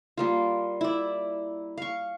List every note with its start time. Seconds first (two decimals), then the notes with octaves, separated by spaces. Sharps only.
0.17 G3 A#3 F4
0.81 E4 D5
1.78 F5 C#6